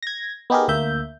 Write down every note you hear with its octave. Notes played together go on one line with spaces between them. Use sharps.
G#6 A#6
B3 D#4 G4 G#4 A#4
D2 A#3 E5 G6